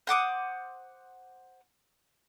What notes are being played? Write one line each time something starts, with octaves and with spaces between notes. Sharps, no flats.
C5 F#5 D6 D#6